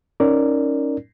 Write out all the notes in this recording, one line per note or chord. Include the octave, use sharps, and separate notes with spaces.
C#4 D#4 A#4 D5